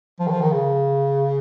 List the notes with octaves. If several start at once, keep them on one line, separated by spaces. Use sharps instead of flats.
F3
D#3
F3
D#3
C#3